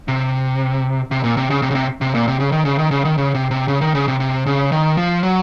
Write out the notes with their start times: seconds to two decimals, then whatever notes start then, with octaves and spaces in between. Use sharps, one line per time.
0.08 C3
1.11 C3
1.24 A#2
1.37 C3
1.50 C#3
1.62 C3
1.71 C#3
1.75 C3
2.01 C3
2.15 A#2
2.28 C3
2.40 C#3
2.52 D#3
2.65 C#3
2.79 D#3
2.91 C#3
3.05 D#3
3.18 C#3
3.34 C3
3.51 C3
3.68 C#3
3.81 D#3
3.95 C#3
4.08 C3
4.20 C3
4.46 C#3
4.72 D#3
4.97 F3
5.23 F#3